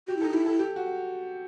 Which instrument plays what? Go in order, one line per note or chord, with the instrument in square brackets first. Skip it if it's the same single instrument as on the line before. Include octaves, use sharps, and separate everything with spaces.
[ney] F#4 [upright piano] G4
[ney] E4
[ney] D#4 [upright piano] A4
[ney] E4 [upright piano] G4
[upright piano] A4
G4
F#4